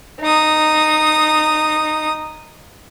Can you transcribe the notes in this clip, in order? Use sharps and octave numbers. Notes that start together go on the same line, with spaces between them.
D#4 D#6